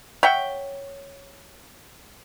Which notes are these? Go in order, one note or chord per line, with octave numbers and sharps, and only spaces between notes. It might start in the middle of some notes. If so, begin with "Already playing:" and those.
C#5 E5 F#5 G5